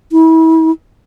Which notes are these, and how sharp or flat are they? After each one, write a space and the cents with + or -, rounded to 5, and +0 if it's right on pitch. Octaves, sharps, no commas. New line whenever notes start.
E4 -35